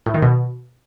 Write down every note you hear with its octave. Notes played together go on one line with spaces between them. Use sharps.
A2
D#3
B2